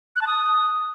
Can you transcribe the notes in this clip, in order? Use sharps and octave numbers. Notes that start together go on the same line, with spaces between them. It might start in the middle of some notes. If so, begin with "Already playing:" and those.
F#6
A5
D#6